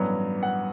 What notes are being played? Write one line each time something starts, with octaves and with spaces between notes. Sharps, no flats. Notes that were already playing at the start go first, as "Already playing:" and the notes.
Already playing: A1 G2 F#3 B3
F#5